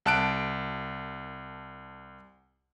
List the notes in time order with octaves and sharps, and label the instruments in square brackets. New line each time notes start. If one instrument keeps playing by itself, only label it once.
[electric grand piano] C2 A5 F#6 D7